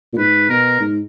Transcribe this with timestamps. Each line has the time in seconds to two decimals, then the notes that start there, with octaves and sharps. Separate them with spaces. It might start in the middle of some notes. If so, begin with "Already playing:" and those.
0.13 A#2
0.17 G#2 B4
0.49 B2 A#4
0.80 G#2